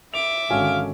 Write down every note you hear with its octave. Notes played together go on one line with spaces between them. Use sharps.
E5 D6 F7
G#1 D3 C#4 F#4 F5 G#5